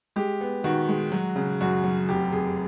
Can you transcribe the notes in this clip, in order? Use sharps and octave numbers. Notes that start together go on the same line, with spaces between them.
G#3 G4
B3
D#3 F#4
G#3
F#3
C#3
F#2 F#4
F#3
F1 G4
F1 G#4